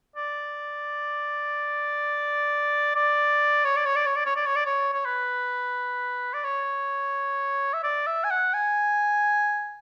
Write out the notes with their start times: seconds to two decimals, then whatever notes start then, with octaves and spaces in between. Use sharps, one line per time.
0.16 D5
2.95 D5
3.65 C#5
3.76 D5
3.86 C#5
3.96 D5
4.06 C#5
4.16 D5
4.26 C#5
4.36 D5
4.46 C#5
4.56 D5
4.66 C#5
4.93 C#5
5.05 B4
6.33 D5
6.44 C#5
7.73 E5
7.83 D5
8.07 E5
8.24 G#5
8.31 F#5
8.54 G#5